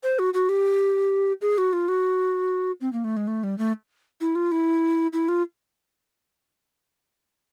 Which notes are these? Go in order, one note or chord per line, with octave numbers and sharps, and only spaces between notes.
C5
F#4
F#4
G4
G#4
F#4
F4
F#4
C4
A#3
A3
G#3
A3
G3
A3
E4
F4
E4
E4
F4